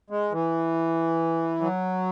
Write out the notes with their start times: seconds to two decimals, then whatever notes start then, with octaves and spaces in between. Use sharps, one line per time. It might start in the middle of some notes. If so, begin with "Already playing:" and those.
0.10 G#3
0.32 E3
1.61 F#3